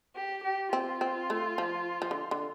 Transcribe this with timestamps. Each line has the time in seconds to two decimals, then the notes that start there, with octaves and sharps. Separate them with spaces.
0.16 G4
0.44 G4
0.73 C4 F4
1.01 C4
1.30 A3
1.58 F3
2.02 F3
2.11 D3
2.31 D3